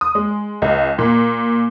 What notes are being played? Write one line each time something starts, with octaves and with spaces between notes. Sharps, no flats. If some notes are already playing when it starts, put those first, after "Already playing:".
D#6
G#3
C#2
A#2